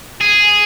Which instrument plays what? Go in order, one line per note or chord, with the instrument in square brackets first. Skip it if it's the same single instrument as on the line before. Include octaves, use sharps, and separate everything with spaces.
[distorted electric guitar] G#4